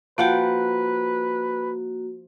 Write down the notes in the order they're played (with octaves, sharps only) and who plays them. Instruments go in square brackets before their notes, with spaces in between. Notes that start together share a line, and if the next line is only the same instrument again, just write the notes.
[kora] F3 F#5 G5 [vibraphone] A#3 F#4 [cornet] B4